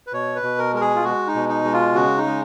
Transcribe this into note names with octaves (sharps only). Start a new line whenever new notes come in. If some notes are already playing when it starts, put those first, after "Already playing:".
B4
B2 C#5
B4
B2
A#4
G#3 A#4
G#4
F4
G#3 F#4
D#4
B2
D#4
G#3
F4
C#3 F#4
D#4
G#3